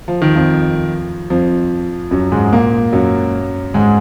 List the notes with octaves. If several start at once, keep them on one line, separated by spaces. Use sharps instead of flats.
F3
D#3
F2 F3
F2 F3
F#2 F#3
G#2 G#3
A#2 A#3
F#2 F#3
G#2 G#3